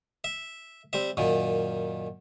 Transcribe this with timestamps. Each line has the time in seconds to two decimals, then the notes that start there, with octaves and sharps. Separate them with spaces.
0.24 E5
0.93 G3 C4 E5
1.17 F#2 A#2 D#3